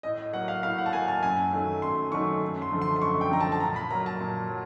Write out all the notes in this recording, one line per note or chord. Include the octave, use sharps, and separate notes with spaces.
A2 D#5
F#3 A#3 F#5
F5
A2 F5
F#5
A5
F#3 A#3 G#5
A5
F#2 G#5
D#3 F#3 A3
F#2 C6
D#3 F#3 A3 C#6
F#2
C6
D3 F3 A3
C6
C6
F#2 C#6
G5
D3 F3 A3 A#5
A5
A5
A#2 A#5
B5
F#3 A#3 A#5
A5
A#2
F#3